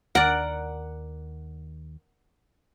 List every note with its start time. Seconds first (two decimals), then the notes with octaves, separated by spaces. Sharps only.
0.15 D#2 A#4 D5 F#5